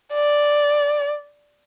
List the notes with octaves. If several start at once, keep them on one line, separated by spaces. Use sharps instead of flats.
D5